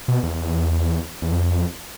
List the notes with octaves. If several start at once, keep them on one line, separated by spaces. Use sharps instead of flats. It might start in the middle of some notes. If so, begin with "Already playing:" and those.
B2
E2
E2
F2